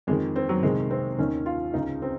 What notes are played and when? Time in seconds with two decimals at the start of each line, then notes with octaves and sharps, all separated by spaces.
0.07 F2 G#3
0.11 D#3
0.36 C4
0.49 F#3
0.63 C2 C3 D#3 G#3
0.90 C4
1.18 D#2 D#3 C#4
1.46 F4
1.74 C#2 C#3 D#4
2.02 C4